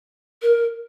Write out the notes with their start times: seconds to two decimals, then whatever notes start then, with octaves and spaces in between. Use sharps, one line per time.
0.42 A#4